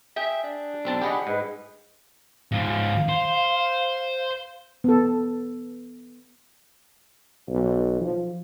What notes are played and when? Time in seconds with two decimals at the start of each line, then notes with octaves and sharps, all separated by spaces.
0.16 G#4 E5 G5
0.44 D4
0.85 B1 C4 A5
1.02 G4 G#4 D#5 F#5 B5
1.27 G#2 G#4 B4 D#5
2.52 G#2 F3 F5
3.09 C5
4.84 B3 A4
7.49 B1
8.01 F3